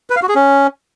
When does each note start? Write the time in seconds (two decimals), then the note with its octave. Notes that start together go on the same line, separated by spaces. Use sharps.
0.10 B4
0.16 F5
0.23 F#4
0.29 G#4
0.35 C#4